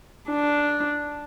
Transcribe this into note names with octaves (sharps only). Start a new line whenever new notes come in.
D4